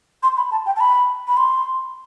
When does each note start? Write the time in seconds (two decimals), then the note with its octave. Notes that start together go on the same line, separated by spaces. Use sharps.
0.23 C6
0.37 B5
0.51 A5
0.66 G5
0.76 A5
0.80 B5
1.28 B5
1.37 C6